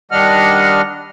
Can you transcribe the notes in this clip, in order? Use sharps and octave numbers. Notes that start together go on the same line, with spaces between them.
D#3 G3 D4 D#5 F#5 F6